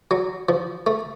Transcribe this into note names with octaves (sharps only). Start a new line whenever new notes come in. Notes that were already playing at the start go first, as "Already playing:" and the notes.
F#3
F3
A3